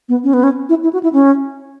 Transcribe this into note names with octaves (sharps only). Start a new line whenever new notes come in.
B3
C#4
B3
C#4
E4
E4
F#4
E4
C#4